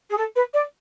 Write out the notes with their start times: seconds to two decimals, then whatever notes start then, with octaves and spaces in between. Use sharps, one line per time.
0.10 G#4
0.17 A4
0.36 B4
0.54 D5